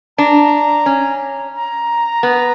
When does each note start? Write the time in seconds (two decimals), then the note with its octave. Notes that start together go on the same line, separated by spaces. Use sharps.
0.18 D4 A#5
0.86 C#4
1.55 A#5
2.23 B3